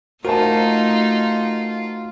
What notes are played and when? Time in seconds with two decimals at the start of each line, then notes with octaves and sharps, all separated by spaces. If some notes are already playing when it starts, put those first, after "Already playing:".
0.25 A3 D#4 F4 F#4 A#4 C5 A5